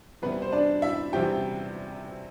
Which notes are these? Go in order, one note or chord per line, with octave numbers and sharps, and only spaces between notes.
E2 C3 G3 B3 C4 E4 B4
C5
D4 D5
E4 E5
E2 C3 G3 C4 E4 G4 G5